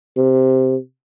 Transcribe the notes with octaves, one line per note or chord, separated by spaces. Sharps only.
C3